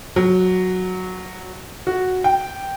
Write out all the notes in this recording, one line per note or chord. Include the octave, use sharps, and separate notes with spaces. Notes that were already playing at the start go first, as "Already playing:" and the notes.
F#3
F#4
G5